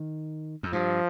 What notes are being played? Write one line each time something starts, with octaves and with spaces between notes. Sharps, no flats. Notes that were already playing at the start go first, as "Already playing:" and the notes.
Already playing: D#3
F2
G2 F3